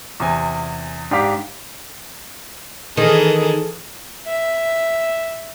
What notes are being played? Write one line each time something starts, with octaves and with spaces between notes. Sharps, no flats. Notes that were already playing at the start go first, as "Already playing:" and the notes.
E2 C3 G#5
G#2 D4 G4 F5 D6 B6
D#3 E3 G#4 A4
E5